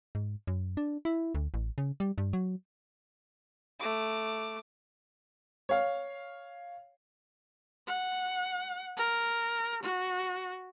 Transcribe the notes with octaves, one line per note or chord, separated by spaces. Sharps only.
G#2
F#2
D4
E4
D2
A1
C#3
G3
G2
F#3
A3 D6
C#5 F5
F#5
A#4
F#4